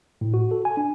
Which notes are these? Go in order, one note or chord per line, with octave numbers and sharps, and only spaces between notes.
A2
F#4
A4
G#5
D4